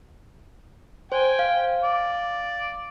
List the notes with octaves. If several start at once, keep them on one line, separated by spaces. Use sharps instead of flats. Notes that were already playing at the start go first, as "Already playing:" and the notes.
C5 G5 G#5
F5
D5